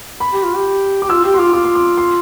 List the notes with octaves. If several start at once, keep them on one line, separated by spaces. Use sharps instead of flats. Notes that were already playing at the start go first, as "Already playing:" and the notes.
B5
G4
F4
G4
G4 D6
F4 E6
G4 E6
C6
F4 D6
F4 D6
C6
D6
C6